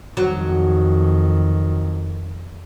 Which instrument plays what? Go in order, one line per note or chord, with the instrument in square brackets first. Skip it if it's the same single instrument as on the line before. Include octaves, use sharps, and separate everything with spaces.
[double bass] F2 D#3 [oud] F#3